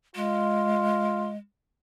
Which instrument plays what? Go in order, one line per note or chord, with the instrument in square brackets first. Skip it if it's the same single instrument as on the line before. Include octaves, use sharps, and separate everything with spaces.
[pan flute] G#3 [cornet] F4